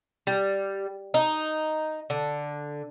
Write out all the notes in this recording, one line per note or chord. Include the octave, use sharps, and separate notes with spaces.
G3
D#4
D3